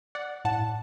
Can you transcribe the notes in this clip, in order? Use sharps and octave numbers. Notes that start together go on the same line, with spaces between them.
D5 F#5
A2 F#5 A5